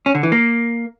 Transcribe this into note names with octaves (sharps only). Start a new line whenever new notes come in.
C#4
D3
E3
A#3